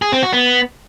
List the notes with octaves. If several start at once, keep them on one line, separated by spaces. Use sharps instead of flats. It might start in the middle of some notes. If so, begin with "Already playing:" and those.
G#4
C4
F#4
B3